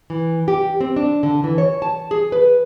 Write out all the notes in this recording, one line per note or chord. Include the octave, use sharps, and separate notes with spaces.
E3
G4
C4
D4
D3
E3
C#5
A5
G#4
B4